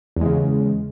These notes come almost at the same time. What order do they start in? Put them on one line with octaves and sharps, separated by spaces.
E2 G#3 C#3